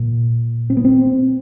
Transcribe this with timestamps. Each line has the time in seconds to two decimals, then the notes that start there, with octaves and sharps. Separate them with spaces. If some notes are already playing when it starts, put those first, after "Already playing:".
Already playing: A#2
0.70 C4
0.77 B3
0.85 C4